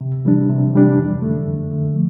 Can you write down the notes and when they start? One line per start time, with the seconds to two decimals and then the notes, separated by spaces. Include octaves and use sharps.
0.01 C3
0.25 E3 G3 D4
0.50 C3
0.73 E3 G3 D4
0.98 F2
1.22 D3 A3
1.47 F2
1.71 D3 A3
1.94 F3